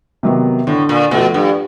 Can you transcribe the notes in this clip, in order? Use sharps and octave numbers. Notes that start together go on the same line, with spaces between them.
C3 D#3 F#3 B3
A2 D3
A#2
B2 F3 A3
G2